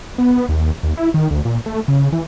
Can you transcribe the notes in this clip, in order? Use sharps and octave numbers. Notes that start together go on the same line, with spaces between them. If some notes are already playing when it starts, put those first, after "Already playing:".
B3
D#2
D#2
E4
D#3
D2
A#2
A3
C#3
E3